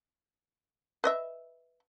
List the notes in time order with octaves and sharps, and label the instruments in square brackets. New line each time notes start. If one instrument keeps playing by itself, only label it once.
[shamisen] B4 D#5 E5